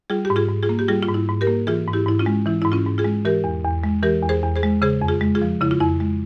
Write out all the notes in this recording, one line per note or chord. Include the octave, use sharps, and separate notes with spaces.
G3 F4 G#4
G4
G#2
F4 G#4
G#2
F4 G#4
A#3
G4
G3 F4 G#4
F4
G#2
E4
G#2
G4 A#4
A#3
E3 F4 G#4
G#2
E4 G4
G#2 E4
C#4 F4
G#3
E3 E4
G#2 E4
C#4 F4
G#2
F4 G#4
G#3
E3 G4 A#4
E2
E2
G#3
E3 G4 A#4
E2
G#4 C5
E2
G#4 C5
G#3
C#3 G#4 C5
F2
F4 G#4
G#3
F4 G#4
F3
C#3 E4
F4
F2 E4
G#3